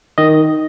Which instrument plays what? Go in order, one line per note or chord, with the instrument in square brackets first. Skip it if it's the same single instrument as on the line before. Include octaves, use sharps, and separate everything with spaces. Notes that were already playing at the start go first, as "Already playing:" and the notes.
[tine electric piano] D#3 D#5